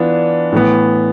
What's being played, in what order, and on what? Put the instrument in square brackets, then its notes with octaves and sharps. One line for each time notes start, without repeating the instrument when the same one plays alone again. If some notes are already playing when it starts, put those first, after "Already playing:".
Already playing: [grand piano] E3 B3 D4 F4
A2 E3 B3